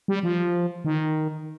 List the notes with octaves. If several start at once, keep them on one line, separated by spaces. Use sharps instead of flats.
G3
F3
D#3